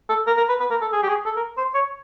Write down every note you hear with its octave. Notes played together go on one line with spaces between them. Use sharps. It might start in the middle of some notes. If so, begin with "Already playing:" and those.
A4
A#4
A#4
B4
B4
A#4
A4
G#4
G4
G#4
A4
A#4
C5
C#5